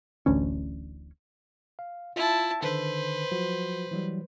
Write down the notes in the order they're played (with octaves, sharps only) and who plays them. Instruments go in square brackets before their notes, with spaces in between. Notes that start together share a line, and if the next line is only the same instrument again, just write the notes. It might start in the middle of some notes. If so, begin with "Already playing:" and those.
[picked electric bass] D1 A1 D2 C#4
[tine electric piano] F5
[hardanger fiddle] E4 A5 [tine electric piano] F4
[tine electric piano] D3 D#3 [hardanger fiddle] B4 C5
[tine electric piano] F3 F#3 F#4
E3 F#3 G3